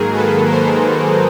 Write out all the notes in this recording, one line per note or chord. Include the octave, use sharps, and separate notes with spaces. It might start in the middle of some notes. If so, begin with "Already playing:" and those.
Already playing: G#2 D#3 F#3 A#3 G#4 A#4
A4 B4
A#4 C5